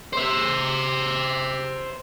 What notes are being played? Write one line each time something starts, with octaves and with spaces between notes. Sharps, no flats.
C5 E5